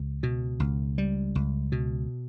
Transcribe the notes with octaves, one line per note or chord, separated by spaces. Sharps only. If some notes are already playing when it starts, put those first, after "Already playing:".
Already playing: C#2
B2
C#2
G3
C#2
B2